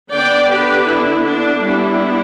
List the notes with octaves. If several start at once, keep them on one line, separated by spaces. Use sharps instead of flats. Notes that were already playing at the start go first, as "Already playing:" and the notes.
D3 B3 D4 D5 G5
G4 B4
E4
D4
G3 B3 D4 E4